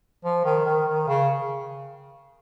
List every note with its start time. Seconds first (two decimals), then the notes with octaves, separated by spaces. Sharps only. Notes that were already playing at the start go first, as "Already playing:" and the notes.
0.25 F3
0.45 D#3
0.66 D#3
0.87 D#3
1.08 C#3